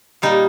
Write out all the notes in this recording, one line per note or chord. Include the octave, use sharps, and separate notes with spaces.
A#2 G3 A#3 D#4